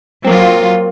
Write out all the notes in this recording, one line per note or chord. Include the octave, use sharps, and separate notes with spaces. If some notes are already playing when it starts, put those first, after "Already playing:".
F#3 A#3 C4 F4